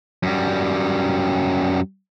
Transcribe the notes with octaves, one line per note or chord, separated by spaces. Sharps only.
F#2 G3